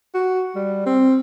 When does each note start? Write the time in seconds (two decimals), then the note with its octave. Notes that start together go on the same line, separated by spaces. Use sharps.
0.14 F#4
0.55 G3
0.86 C4